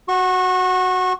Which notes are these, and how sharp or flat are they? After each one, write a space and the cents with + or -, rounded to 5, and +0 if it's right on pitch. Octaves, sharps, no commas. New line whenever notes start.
F#4 +0 C#6 -30